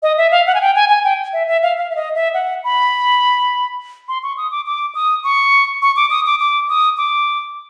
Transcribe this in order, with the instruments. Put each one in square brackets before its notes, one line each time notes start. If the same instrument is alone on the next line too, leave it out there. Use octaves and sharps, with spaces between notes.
[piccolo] D#5
E5
F5
F#5
G#5
G5
G#5
G#5
G5
E5
E5
F5
F5
E5
D#5
E5
F#5
B5
C6
C#6
D#6
D6
D6
D#6
C#6
C#6
D6
D#6
D6
D6
D#6
D6